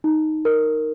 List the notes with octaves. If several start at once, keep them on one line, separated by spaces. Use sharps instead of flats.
D#4
A#4